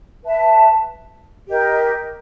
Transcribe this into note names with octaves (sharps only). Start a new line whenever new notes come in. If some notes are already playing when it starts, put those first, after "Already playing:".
B4 E5 A5
G4 A#4 D#5